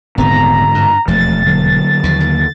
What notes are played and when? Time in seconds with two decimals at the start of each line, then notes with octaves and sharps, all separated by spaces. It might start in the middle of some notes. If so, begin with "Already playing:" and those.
0.18 D#1 G#2 D3 B3 C4 A#5
0.74 G2
1.08 E1 D#2 F3 A3 A6
1.46 D3 F#3 A#3
2.04 D#2 F3
2.20 D#2